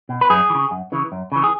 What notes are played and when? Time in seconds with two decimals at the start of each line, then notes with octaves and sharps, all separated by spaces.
0.09 B2
0.21 B4
0.30 F#2 G#4
0.50 E3
0.55 C#3
0.71 F#2
0.92 C#3 E3
1.12 F#2
1.32 C#3 E3
1.44 G#4